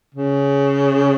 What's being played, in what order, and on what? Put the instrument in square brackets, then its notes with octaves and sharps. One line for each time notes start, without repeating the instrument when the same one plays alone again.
[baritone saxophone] C#3